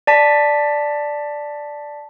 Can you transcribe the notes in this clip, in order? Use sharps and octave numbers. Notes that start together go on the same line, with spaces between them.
D5 A5 B6